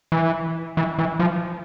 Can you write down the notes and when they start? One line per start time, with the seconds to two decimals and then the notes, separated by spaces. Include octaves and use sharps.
0.12 E3
0.77 E3
0.98 E3
1.20 F3